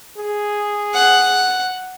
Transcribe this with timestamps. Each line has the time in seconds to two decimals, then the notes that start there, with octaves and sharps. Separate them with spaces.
0.18 G#4
0.94 F#5